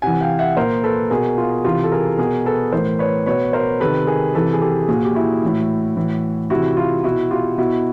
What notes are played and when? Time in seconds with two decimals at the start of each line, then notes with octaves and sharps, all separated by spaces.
0.02 C3 E3 F#5 G#5
0.21 F5 G5
0.39 E5 F#5
0.57 A#2 A#4 C5
0.84 A4 B4
1.10 B2 G#4 A#4
1.38 F4
1.64 C3 E3 F4
1.84 A4
1.92 G#4 A#4
2.18 B2 G#4 A#4
2.45 A4 B4
2.72 A2 E3 A#4 C5
2.99 B4 C#5
3.26 B2 B4 C#5
3.53 A#4 C5
3.80 C3 D#3 A4 B4
4.07 G#4 A#4
4.35 C3 E3 A4 B4
4.53 G#4
4.61 G4 A4
4.88 A#2 F#4 G#4
5.04 G4
5.15 E4 F#4
5.42 A2 E3
5.97 A2 E3
6.50 C3 E3 E4 F#4
6.77 F4
7.04 B2 E4 F#4
7.31 F4 G4
7.58 B2 E4 F#4